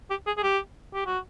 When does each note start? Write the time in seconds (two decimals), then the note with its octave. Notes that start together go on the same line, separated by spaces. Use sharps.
0.10 G4
0.27 G#4
0.37 G#4
0.43 G4
0.94 G4
1.06 F#4